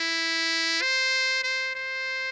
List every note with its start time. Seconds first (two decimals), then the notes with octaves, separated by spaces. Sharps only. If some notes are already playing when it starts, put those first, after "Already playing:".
Already playing: E4
0.81 C5
1.43 C5
1.75 C5